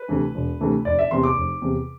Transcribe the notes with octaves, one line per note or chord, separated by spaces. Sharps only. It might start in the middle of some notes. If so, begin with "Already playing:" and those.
Already playing: B4
D2 C3 E3 A3
E1
D2 C3 E3 A3
F1 D5
E5
E2 C3 E3 C6
D6
F1
E2 C3 E3